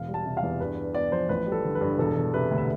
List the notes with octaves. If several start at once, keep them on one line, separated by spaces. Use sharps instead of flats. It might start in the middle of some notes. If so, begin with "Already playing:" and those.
Already playing: E1 F5
G3
A5
C3
F5
E2
G2 B4
D4
B3 D5
F3 C5
A1 B4
G3
A4
D3
B4
G2
E1 A4
E1
C3 B4
D2
E5